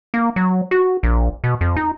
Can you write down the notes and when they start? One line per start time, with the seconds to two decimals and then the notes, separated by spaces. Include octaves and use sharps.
0.14 A#3
0.36 F#3
0.71 F#4
1.03 A#1
1.44 B2
1.61 F2
1.76 D#4